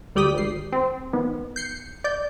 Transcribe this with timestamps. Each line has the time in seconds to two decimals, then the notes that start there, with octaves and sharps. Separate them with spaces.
0.15 D2 G3 D5 G5 D#6 B6
0.34 G#1 C7
0.73 C4
1.13 D#3 B3
1.56 G6 C7 C#7
2.04 D5 G6